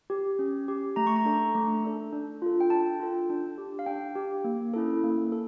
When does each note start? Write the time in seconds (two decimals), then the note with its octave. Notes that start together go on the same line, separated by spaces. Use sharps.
0.10 G4
0.39 C#4
0.68 G4
0.96 A3 A#5
1.07 C#6
1.16 A#5
1.25 D4 A4
1.55 A3
1.84 D4 A4
2.13 D4
2.42 F4 A4
2.61 G5
2.70 D4 A5
3.00 F4 A4
3.30 D4
3.58 G4
3.79 F5
3.86 D4 G5
4.15 G4
4.44 A#3
4.74 C#4 E4 A4
5.03 A#3
5.32 A4